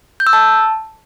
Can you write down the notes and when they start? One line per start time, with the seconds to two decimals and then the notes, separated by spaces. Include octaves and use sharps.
0.20 G6
0.27 E6
0.33 A5